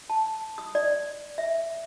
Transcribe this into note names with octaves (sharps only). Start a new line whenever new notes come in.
A5
D#6
D5
E5